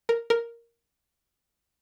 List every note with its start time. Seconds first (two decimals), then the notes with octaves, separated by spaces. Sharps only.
0.09 A#4
0.30 A#4